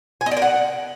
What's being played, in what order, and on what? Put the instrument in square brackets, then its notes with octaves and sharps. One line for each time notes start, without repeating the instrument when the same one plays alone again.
[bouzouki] G#5
D#5
D5
A#4
F#5